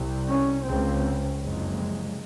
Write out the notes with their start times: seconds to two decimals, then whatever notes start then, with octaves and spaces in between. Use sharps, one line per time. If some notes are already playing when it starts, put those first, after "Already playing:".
Already playing: C2 C3
0.28 C#4
0.66 C#2 C#3 C4
1.42 F#1 F2 C3 G#3